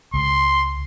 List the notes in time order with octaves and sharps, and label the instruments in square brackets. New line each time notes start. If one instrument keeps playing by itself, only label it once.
[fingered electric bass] C#2 [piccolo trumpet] C6